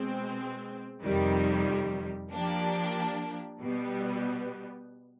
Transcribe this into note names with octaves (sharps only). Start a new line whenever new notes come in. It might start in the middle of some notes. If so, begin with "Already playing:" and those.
Already playing: B2 G#3 C4
F2 C3 D#3 G3
F3 A#3 D4 G4
B2 G3 B3